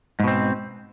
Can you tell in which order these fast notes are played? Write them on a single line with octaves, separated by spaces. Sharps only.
G#2 B2 C4